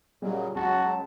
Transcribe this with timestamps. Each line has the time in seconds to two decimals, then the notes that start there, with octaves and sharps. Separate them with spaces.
0.22 A#2 C#3 F#3 G3 G#4 D#5
0.55 C#2 F#3 F#4 A5